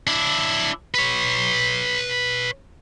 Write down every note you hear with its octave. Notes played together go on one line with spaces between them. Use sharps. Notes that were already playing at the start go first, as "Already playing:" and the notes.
D4 E4
B4 C#5